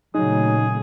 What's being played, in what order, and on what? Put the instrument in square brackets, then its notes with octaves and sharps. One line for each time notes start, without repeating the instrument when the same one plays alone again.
[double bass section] A#2 C#3 A3 [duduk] F#3 [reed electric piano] D#4 [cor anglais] G#4